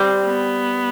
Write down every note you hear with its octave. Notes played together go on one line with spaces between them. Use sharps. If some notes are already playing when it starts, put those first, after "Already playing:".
Already playing: G3 C4
B3